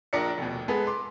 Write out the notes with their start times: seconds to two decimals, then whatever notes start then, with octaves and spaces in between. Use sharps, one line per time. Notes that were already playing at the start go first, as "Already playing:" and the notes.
0.13 A#1 F3 D4 A#4 D5 C#7
0.38 F1 D#2 B2
0.68 G#3 B3 G#4 A4 B4
0.87 C6 D6